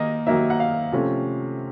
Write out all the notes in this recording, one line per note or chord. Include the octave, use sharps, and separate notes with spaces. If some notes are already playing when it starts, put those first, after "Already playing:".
Already playing: D#3 A#3 D#4 D#5
D#3 F#3 A#3 D#4 E5
F#5
F5
C3 F3 A3 C#4